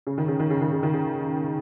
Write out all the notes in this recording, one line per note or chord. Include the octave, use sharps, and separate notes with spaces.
C#3
D#3
C#3
D#3
C#3
D#3
C#3
D#3
C#3